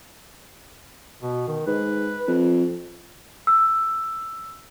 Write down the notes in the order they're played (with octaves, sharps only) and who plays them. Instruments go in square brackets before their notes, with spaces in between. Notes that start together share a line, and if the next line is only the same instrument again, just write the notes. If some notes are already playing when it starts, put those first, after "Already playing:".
[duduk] B2
D#3
[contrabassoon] G#2 [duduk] B4
[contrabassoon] F2
[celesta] E6